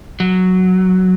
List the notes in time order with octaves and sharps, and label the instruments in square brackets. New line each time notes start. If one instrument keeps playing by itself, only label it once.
[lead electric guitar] F#3